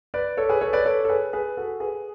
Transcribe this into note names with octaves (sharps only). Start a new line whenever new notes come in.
B4 D5
A4 C#5
G#4 B4
A4 C#5
B4 D5
A4 C#5
A4
G#4 B4
G#4 B4
F#4 A4
G#4 B4